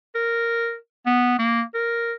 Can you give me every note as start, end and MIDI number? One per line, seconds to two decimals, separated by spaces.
0.15 0.76 70
1.06 1.37 59
1.39 1.62 58
1.74 2.13 70